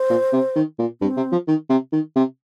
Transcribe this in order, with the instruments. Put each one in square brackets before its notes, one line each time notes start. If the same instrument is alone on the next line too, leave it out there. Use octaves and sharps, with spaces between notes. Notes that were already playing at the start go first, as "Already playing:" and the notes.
Already playing: [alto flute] C5
[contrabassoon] A#2
C3
D#3
A#2
[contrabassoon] G2 [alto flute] C4
[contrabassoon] C3
F3
D#3
C3
D#3
C3